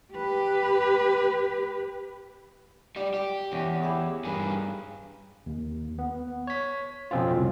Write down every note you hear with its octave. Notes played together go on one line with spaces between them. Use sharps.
G4 B4
G3 D4 G4
G4
E2 C#4 G4
E4 G4 G#4
G2 G#4 A#4 B4
D#2
B3
C#5 B6
F2 B2 C4 C#4 F4
C2